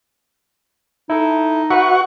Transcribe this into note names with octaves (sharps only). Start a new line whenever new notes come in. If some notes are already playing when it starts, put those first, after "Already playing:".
D#4 E4 A4
F#4 B4 E5 F#5 C#6